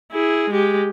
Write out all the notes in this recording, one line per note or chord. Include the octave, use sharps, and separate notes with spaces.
E4 G#4
G#3 G4